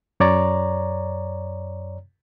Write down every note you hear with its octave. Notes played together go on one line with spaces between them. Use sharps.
F#2 C#5 D5 A#5